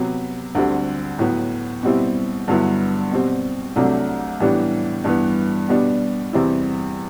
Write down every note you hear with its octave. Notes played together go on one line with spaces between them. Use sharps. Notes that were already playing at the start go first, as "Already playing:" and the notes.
Already playing: C3 F#3 B3
D2 D3 G3 C4
A2 F#3 B3
B2 G3 C4 E4
G2 D3 F#3 B3 E4
B2 G3 C4
C2 C3 F#3 A3 D4
A2 E3 G3 B3 D4
G2 E3 B3
B2 G3 B3 D4
E2 C3 G3 C4 E4